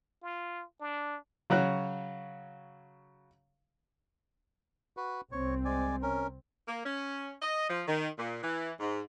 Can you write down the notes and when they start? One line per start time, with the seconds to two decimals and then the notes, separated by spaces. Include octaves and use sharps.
0.22 F4
0.80 D4
1.50 C#3 F#3 F#4 F#6
4.97 F#4 B4
5.32 C2 C4 C#5
5.65 G#3 D5 G#5
6.02 C#4 A#4
6.68 A#3
6.84 C#4
7.41 D#5
7.68 F3
7.87 D#3
8.17 A#2
8.42 E3
8.79 G#2